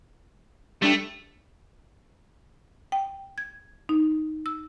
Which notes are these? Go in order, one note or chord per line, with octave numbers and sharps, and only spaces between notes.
G3 A3 D4 G4
G5
G#6
D#4
E6